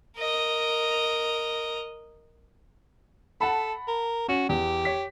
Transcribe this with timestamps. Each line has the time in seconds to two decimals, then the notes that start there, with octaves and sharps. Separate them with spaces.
0.18 A#4 D#5
3.41 A4 F#5 A5 B5
3.88 A#4
4.28 C#4 F#4
4.49 E2 G4
4.85 C#5 B6